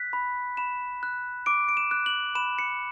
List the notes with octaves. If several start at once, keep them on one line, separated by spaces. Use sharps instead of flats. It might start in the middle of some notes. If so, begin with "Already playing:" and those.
Already playing: F#6 B6
B5
B5 E7
F#6
D6 D7
D7
E7
F#6
F#7
B5 E7
C#7